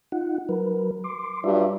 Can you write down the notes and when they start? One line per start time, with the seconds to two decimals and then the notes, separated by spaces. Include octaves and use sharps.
0.12 D#4 F4 F#5
0.49 F#3 A#4 B4
1.04 C6 D6
1.44 G2 F#3 F4 D5 E5